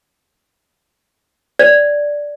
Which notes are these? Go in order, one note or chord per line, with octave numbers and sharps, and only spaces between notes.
D5